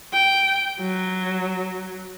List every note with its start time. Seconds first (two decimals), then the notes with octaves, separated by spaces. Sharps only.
0.13 G5
0.80 F#3